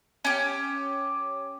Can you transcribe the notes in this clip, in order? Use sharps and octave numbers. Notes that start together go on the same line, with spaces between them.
C#4 G4